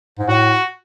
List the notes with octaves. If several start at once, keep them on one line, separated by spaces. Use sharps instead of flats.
G#2
A2 F#4